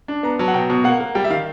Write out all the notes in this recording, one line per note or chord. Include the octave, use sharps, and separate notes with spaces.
D4
B3 A#5
F#3 A5
F#5
B2 G5
B2
A#3 F#5
A#3
G3 G5
E5
D#3 F5